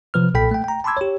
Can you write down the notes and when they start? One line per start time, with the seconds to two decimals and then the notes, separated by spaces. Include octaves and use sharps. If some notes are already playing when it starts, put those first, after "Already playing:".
0.14 C3 F3 B4 F6
0.34 B1 A#2 A4 G5 B5 B6
0.51 A3 G5
0.64 G5 A#5
0.84 A5 B5 C6 D6 E6 G#6
0.97 G4 C#5